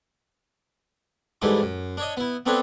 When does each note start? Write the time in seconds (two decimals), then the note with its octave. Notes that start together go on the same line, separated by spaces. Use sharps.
1.42 G#2 E3 G3 A3 D#4
1.62 F#2
1.97 D4 C#5 D#5
2.17 B3 E4
2.46 B3 C4 D4 A4 B4 C#5